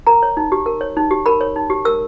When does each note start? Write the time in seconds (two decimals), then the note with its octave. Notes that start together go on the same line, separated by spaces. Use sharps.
0.07 A#4 A#5
0.23 C#5
0.37 D#4
0.52 G4
0.66 A#4
0.81 C#5
0.97 D#4
1.11 G4
1.26 A#4 B5
1.41 C#5
1.56 D#4
1.70 G4
1.85 A#4 E6